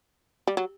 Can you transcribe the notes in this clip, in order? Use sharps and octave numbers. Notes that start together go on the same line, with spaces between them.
G3
F#3